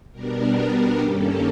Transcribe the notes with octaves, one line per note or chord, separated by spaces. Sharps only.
B2 G3 B3 D4 A#4
G2 D#3 G3 A#3 C#4 A4